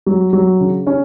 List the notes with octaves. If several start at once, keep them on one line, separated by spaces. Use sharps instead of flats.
F#3
F#3
C#3
C#4